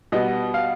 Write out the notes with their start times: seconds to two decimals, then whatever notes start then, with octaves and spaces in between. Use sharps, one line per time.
0.12 B2 G3 B3 D#5
0.54 F5